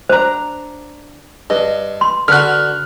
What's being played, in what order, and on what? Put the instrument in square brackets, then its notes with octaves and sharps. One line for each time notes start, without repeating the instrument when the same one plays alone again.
[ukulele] D4 A#5 [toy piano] C5
[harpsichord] G2 [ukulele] D#5
[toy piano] C6
[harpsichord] D3 F#4 [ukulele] B4 [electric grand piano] F6 F#6